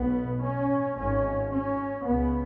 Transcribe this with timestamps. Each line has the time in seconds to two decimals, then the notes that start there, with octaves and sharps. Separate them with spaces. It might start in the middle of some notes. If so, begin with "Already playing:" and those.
Already playing: B1 B2 B3
0.42 C#4
0.97 G#1 G#2 C#4
1.51 C#4
2.05 C#2 C#3 B3